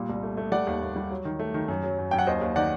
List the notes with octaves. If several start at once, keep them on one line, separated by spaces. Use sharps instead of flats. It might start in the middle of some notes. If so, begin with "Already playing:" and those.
Already playing: A#2 G3
C2
A3
A3
G3 D5 F#5
D#2
D#2
G3
F#3
D#3
A3
D#3
F#2
F#3
F#2
F#2 G5
F#5
D#2 C5 D#5
D#2
D#3 D5 F#5